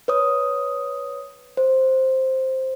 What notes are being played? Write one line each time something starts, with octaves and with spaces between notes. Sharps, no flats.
B4 C#5 D#6
C5